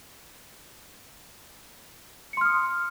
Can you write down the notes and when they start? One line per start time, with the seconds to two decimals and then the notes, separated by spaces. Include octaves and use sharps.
2.33 C#7
2.37 C6
2.41 F6
2.45 D#6